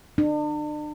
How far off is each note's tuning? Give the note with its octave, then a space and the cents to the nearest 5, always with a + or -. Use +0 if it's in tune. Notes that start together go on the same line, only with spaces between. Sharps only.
D4 +40